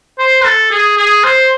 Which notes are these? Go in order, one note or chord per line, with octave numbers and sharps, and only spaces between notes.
C5
A4
G#4
G#4
C5